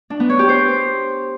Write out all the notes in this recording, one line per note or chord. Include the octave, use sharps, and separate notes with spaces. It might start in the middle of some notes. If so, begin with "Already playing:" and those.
D4
B3
C#5
G4
C5